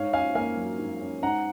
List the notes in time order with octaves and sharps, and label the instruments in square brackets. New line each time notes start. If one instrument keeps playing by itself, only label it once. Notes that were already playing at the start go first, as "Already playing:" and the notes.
Already playing: [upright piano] G#2 C#5 F5
C#4 F5 G#5
A#3 F5 G#5
F#3
G#2
C#4
G#2 F#5 A#5